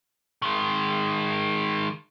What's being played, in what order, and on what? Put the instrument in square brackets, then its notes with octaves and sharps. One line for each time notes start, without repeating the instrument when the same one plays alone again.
[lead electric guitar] D#3 G#3